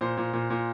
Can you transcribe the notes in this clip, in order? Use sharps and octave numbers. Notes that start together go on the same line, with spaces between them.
A#2 C5
A#2
A#2
A#2